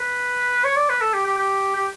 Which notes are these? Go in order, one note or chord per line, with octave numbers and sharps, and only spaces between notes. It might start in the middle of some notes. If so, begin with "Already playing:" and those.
Already playing: B4
C#5
D5
B4
A4
G4
G4
G4
G4